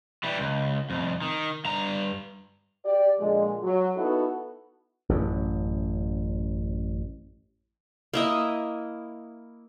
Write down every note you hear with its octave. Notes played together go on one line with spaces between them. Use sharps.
E3 G3
C#2
C2 F2
D#3
G2 A#5
G4 D5
A#2 D3 F3 G#3
F#3 F#4
B3 D#4 E4 F#4 A4
A1 F#2
A#3 E4 D#5